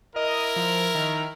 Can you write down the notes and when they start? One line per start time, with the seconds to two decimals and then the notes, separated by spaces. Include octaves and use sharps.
0.16 E4 A#4 D#5
0.56 F3
0.95 D#3